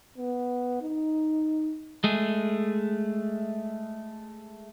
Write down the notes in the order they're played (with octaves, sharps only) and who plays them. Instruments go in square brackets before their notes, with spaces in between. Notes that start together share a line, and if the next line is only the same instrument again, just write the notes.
[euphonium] B3
D#4
[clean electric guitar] G#3 A3 G#4